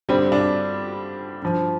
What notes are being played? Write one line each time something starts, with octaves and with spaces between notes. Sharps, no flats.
G2 D3 G3 C4
D4
G2 F3